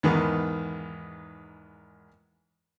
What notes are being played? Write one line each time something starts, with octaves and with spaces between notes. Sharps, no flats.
E2 G#2 D#3 B3